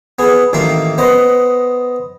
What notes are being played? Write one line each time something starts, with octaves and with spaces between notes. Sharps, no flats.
B3 G#4
A1 D#3 A#3 E5 C6
B3 C5 D#5